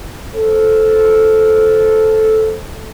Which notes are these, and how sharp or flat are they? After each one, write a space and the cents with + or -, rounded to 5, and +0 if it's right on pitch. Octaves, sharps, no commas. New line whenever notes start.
A4 -5 C5 +0